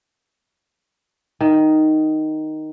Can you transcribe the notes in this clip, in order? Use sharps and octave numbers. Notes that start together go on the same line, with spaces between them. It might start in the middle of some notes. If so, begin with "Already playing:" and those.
D#3